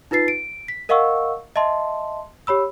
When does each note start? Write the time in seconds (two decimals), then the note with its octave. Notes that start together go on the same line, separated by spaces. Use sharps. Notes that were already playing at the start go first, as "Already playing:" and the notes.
0.11 D#4 F4 B4 A6 C7
0.28 D7
0.68 B6
0.89 A#4 D#5 F5 F#5 C#6 E6
1.56 D#5 E5 A5 C6
2.47 G4 C#5 B5 E6